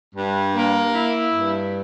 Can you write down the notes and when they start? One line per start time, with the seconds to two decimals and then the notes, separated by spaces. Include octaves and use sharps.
0.15 G2
0.55 A#3
0.94 E4
1.33 G2